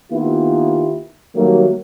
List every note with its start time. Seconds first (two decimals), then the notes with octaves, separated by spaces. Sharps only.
0.12 D#3 A#3 B3 E4 F4 G4
1.35 D#3 F#3 G3 A3 A#3